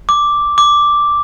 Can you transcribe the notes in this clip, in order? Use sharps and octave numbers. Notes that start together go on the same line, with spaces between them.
D6
D6